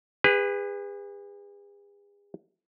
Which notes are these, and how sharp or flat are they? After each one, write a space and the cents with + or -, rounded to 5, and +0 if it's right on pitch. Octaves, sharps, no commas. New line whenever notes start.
G#4 -40 B4 +5